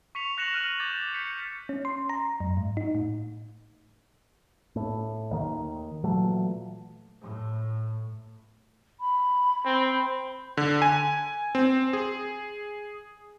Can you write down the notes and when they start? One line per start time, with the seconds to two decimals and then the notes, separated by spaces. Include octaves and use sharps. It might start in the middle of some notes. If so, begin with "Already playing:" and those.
0.15 C#6 B6 C#7 F7
0.37 C#6 F#6 A#6 C#7 E7 F#7
0.54 F6 F#6 D#7 F#7
0.80 D6 G6 A6
1.14 G6 B6 C#7
1.69 C#4
1.85 C6
2.09 A#5
2.40 F#2
2.57 G#2
2.77 D#4
2.95 A2
4.76 A2
5.31 D#2 D#3
6.04 A#2 E3 F#3 A3
7.21 A2
9.00 B5
9.65 C4
10.57 D3
10.82 G#5
11.55 C4
11.93 G#4